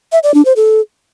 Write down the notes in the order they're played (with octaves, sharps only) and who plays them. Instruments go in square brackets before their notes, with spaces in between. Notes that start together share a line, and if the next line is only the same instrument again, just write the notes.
[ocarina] E5
D5
D4
C5
A4